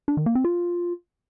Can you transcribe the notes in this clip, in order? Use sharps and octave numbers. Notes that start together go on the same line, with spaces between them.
D4
D#3
A#3
C4
F4